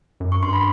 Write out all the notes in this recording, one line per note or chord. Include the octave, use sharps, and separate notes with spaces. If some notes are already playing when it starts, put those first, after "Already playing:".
F#2
C#6
G2 C6
B5